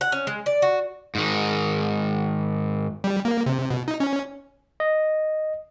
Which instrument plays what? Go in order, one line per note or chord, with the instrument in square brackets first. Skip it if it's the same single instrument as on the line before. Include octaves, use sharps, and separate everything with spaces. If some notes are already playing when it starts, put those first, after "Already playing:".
[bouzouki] F#5
C#4
G#3
D5
F#4
[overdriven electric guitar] G#2 D#3
[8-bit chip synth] G3
A#3
C3
B2
D#4
C#4
[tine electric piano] D#5